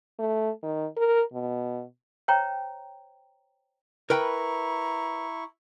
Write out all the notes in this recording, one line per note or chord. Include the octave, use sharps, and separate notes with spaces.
A3
D#3
A#4
B2
C5 C#5 G5 A#5
E4 A#4 B4 G5 A#5 C#6